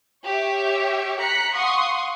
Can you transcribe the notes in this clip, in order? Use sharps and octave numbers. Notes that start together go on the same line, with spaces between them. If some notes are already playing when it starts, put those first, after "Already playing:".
G4 C#5 E5
A#5 F#6 B6 C#7
F5 F#5 C6 C#6 D#6